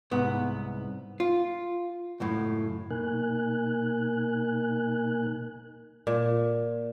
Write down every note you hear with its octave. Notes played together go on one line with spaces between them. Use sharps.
C2 G#2 B3
F4
C#2 F#2 A2
B2 A#3 D#4 A#4 G#5 F#6
A#2